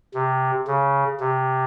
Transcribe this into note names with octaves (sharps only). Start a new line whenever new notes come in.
C3
C#3
C3